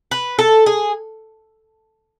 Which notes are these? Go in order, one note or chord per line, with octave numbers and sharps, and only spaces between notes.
B4
A4
G#4